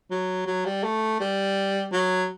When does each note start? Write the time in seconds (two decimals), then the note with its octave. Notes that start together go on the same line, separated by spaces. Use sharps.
0.11 F#3
0.46 F#3
0.66 G3
0.84 A3
1.20 G3
1.92 F#3